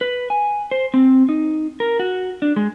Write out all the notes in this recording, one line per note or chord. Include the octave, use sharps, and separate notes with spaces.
B4
G#5
C5
C4
D#4
A#4
F#4
D4
G#3